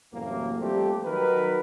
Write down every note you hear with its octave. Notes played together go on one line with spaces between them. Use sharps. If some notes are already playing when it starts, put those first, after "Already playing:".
C2 F#2 A2 E3 A#3
F3 G3 A3 A#3 C4 G4
D#3 F#3 A#4 B4